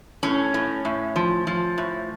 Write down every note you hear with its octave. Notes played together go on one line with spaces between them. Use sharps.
A2 C#4
A2
A2
F3
F3
A2